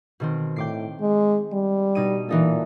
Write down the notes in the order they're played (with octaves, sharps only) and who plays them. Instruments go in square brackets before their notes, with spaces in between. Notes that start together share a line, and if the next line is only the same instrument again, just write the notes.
[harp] B2 D#3 C4
[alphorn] A2 [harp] G5 D6 C7
[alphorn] G#3
G3
[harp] B2 D#4 D#7
[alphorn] A#2 [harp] E3 D#4 A4